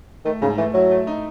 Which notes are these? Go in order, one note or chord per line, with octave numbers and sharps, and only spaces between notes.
D#3 A3
G#2 C#3
E3 A3
F#3 E4
A3
D#4